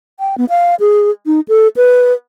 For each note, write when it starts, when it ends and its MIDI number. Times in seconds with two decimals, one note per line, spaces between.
0.20 0.35 79
0.38 0.45 59
0.50 0.75 77
0.80 1.11 68
1.26 1.40 63
1.48 1.68 69
1.77 2.13 71